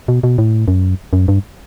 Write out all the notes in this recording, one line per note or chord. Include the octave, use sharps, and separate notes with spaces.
B2
B2
A2
F#2
F#2
G2